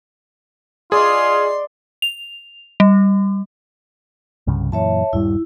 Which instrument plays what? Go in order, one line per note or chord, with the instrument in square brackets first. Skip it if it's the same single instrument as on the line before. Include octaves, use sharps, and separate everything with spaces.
[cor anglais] F4 [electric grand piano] G#4 [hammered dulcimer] D5 D#5 [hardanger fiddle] C6
[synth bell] F7
G3
[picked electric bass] C2 G2 C#3
[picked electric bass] F#2 A#2 E3 [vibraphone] C#5 E5 A5
[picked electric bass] D#1 G2 G3 [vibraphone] E4